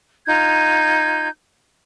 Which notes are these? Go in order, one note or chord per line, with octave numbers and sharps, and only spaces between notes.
D#4 F4 G6 G#6